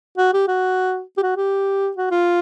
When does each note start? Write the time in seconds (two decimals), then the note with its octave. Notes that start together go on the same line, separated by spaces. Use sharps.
0.18 F#4
0.33 G4
0.48 F#4
1.17 G4
1.23 F#4
1.37 G4
1.97 F#4
2.11 F4